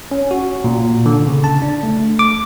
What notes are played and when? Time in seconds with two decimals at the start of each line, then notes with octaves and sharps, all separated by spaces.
0.11 C#4
0.31 F#4
0.64 A#2
1.06 D3
1.27 C#3
1.44 A5
1.62 D4
1.83 A3
2.19 D6